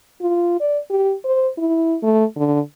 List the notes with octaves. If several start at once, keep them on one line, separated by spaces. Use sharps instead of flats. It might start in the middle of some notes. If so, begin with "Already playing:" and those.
F4
D5
G4
C5
E4
A3
D3